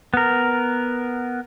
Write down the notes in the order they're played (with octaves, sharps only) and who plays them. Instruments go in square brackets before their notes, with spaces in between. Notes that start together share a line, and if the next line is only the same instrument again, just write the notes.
[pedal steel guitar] B3 A#4